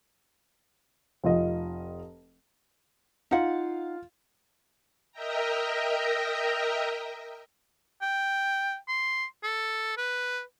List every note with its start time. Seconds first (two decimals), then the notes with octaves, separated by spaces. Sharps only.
1.24 F1 F4 D#5
3.31 D#4 F4 F5 F#5
5.12 A#4 D#5 E5 G5 A#5
8.01 G5
8.88 C6
9.43 A4
9.97 B4